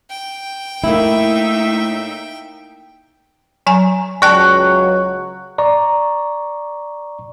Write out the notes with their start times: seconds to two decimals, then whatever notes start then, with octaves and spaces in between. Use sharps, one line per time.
0.10 G5
0.84 A2 A#3 D#4 E4 E5
3.66 F#3 G#5 A#5
4.22 C#2 F#3 D5 G5 A5 C#6 F#6
5.58 D5 A#5 C#6